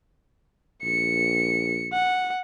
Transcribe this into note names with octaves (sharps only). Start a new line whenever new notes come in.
A#1 C#7
F#5